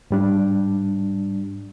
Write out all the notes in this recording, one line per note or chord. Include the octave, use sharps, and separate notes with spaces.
G#2 G3 D4